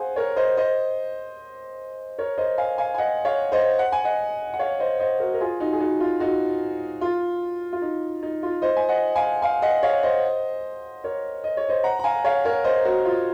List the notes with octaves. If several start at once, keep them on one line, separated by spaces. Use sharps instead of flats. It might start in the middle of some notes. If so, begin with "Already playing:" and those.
Already playing: G#4 C5 F5 F#5 G#5
A#4 C#5
C5 D#5
C5 D#5
A#4 C#5
C5 D#5
F5 G#5
F5 G#5
G#5
D#5 F#5
C#5 F5
C5 D#5
F#5
G#5
D#5 F#5
F#5
C#5 F5
C5 D#5
C5 D#5
F#4 A#4
A#4
F4 G#4
D#4 F#4
G#4
D#4 F#4
F4
D#4 F#4
F4
F4
D#4
D#4
F4
C5 D#5
G#5
D#5 F#5
F5 G#5
F5 G#5
D#5 F#5
C#5 F5
C5 D#5
A#4 C#5
D#5
C#5
C5 D#5
F#5 A#5
A#5
F5 G#5
C#5 F5
A#4 C#5
C5 D#5
F#4 A#4
F4